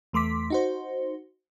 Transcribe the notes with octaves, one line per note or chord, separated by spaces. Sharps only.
E2 A3 C6 D6 B6
D#4 F#4 C5